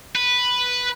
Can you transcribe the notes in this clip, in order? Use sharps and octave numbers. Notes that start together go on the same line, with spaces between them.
B4